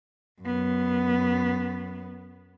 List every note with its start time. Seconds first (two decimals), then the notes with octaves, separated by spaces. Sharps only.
0.41 F#2 B3